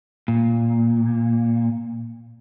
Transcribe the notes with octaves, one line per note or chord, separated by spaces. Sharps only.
A#2